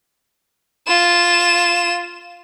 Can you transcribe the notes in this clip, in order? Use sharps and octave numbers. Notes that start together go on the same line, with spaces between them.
F4 E7